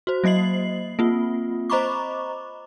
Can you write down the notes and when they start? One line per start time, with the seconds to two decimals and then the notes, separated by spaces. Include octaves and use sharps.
0.07 F#4 C5
0.24 F#3 A#3 D#5 C7 F#7
0.99 A#3 C4 F4
1.70 C5 D#5 A#5 B5 C#6 D6